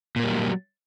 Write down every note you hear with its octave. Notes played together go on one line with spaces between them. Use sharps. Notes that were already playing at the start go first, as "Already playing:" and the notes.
A#2 F#3 G3 A#3